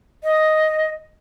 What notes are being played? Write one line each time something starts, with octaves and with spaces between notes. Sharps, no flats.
D#5